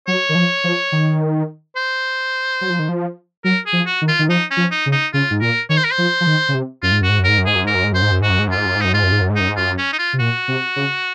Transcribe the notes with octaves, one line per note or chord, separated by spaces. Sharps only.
F#3 C#5
D#3
F3
F3
D#3
C5
F#3
F3
D#3
F3
F#3 A#4
G#4
F3
F#4
D#3
F4
D#3
F3 D#4
C#4
F3
D#4
C#3
D#4
C#3 F4
G#2
A#2 A#4
D#3 C#5
C5
A#4
C5
F3
F3
D#3
C#3
C3
F#2 F4
G#2
F#2 F#4
G#2
F#2
G#2 A#4
F#2
G#2 G#4
F#2
G#2 A#4
F#2
G#2
F#2 C5
G#2
F#2
G#2 F#4
F#2
G#2
F#2 F4
G#2
F#2
G#2
F#2 D#4
G#2 F4
F#2
G#2
F#2
G#2
F#2 D#4
G#2
F#2 F4
C#4
D#4
F4
C3
A#2 F#4
C3
C#3